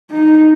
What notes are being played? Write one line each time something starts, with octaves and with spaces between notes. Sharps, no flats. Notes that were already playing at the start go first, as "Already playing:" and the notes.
D#4